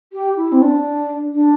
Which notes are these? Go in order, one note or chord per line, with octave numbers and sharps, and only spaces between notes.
G4
E4
C4
D4
D4